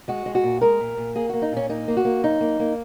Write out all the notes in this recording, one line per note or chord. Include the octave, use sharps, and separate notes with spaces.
G#3 F#4
G#3
F#4
A#2
G#3 A#4
A#2
A#2
A#3 G#4
A#3 F#4
D#4
A#2 C#4
A#3 D#4
A#3
F#4
A#3
F#2 D#4
A#3
A#3